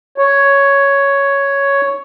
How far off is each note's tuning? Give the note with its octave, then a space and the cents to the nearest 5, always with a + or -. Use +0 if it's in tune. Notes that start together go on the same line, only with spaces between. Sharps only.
C#5 +5